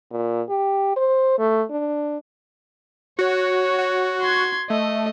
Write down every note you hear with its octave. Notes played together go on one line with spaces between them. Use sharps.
A#2
G4
C5
A3
D4
F#4 C#5
F#4
C6 G#6
A3 D#5